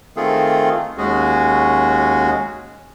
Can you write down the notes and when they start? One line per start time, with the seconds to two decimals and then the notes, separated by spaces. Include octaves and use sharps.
0.17 D#3 A3 C4 F4 G#4 A4
0.98 D#2 G#3 C#4 F#4 G#4